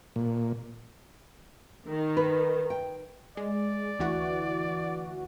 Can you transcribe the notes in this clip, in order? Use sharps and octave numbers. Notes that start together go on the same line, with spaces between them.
A#2
D#3
B4
G5
G#3 D5
D2 E3 F#4